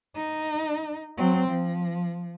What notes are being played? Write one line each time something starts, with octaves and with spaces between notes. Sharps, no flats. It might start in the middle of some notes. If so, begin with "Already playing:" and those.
D#4
F#3 C4
F3